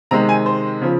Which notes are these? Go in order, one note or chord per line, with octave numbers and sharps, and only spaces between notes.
C3 D#3 G#3 A#5
G#5
C5
C#3 F3